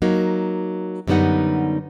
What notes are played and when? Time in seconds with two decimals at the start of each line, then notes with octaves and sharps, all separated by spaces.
0.02 F#3 A#3 D#4
1.07 F#2 D3 G3 B3 D#4 F#5